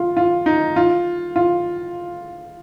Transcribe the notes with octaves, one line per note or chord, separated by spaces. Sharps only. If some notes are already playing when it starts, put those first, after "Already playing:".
Already playing: F4
F4
D#4
F4
F4